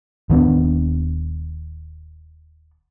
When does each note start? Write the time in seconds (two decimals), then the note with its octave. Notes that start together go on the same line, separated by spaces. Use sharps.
0.30 D#1 D#3 B3 D4